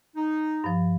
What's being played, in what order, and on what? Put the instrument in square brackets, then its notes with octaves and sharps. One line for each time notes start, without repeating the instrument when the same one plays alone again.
[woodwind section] D#4
[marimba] G2 F3